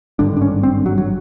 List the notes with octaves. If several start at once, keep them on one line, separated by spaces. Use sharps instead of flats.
G#1 G2 D3 D4
D4
C#4
C4
F#3
F#3